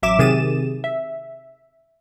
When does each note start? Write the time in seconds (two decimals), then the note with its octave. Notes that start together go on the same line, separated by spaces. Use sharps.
0.02 A1 F#3 E5 D6 E7
0.19 C3 D#3 G#4 A6 D#7 E7
0.84 E5